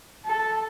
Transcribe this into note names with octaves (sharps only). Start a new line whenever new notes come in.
A4